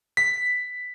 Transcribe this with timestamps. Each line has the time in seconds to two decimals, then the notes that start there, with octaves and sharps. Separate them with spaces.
0.17 B6